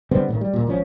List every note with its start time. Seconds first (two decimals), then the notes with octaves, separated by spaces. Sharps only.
0.11 D3 G3 B3 C4
0.28 A2 C3 D#3
0.41 G3
0.53 D#1 A#2
0.67 G#1 F3 C#4